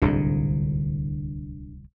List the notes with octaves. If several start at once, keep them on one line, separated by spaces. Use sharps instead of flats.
D1 C2 G#2 D3